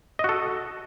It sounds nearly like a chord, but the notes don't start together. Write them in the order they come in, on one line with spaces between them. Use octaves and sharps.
D#5 F#4 A4